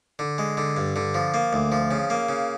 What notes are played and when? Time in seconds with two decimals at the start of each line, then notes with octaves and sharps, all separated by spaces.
0.19 D3
0.38 G#3
0.57 D3
0.77 G2
0.96 D3
1.14 F3
1.34 A#3
1.53 D2
1.72 F3
1.91 C#3
2.10 A#3
2.29 C#3